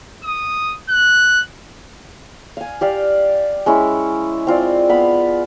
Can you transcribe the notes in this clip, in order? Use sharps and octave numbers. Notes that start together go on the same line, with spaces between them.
D#6
F#6
F5 G#5
G4 D5 F5
G#3 C#4 E4
C4 F4 D5
B3 F5 B5